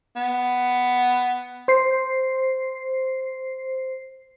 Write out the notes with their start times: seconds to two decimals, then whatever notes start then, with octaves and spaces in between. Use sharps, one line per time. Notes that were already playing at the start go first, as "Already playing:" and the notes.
0.16 B3
1.68 C5 C7